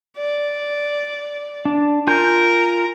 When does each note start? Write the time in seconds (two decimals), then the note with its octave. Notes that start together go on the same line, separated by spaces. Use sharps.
0.17 D5
1.65 D4
2.07 F4 A#4 G#5 G6